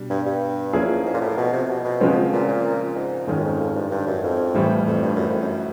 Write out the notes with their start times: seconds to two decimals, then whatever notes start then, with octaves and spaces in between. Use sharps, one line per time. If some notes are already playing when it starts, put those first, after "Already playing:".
Already playing: B2 G3 D4
0.10 G2
0.26 G2
0.73 F3 A#3 C#4 E4 G#4
1.05 G#2
1.14 A#2
1.21 A2
1.37 B2
1.53 C3
1.69 B2
1.85 B2
2.00 C#3 F3 G#3 C4
2.32 A#2
2.48 A#2
2.95 G#2
3.27 F2 G#2 D#3 G#3 C#4
3.36 F#2
3.44 F2
3.60 F2
3.75 G2
3.91 G2
4.07 F#2
4.23 F2
4.54 A2 E3 G3
4.87 F2
5.02 G2
5.16 F#2
5.29 F2
5.41 F#2